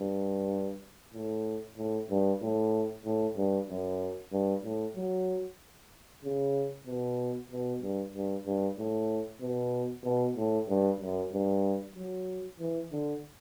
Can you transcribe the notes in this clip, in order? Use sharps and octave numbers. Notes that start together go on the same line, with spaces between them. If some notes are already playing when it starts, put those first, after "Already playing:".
Already playing: G2
A2
A2
G2
A2
A2
G2
F#2
G2
A2
F#3
C#3
B2
B2
G2
G2
G2
A2
B2
B2
A2
G2
F#2
G2
F#3
E3
D3